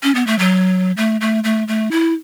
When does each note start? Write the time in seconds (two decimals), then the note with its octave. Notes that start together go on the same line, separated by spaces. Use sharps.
0.03 C#4
0.15 B3
0.27 A3
0.39 F#3
0.97 A3
1.21 A3
1.44 A3
1.68 A3
1.91 E4